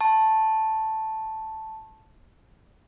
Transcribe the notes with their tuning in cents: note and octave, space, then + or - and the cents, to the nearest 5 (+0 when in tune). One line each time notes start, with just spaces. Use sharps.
A5 +0 C#6 -40